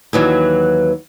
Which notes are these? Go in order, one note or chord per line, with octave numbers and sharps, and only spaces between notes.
D#2 E3 F#3